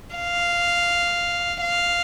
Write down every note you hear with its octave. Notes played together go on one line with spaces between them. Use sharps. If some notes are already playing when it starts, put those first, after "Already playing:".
F5
F5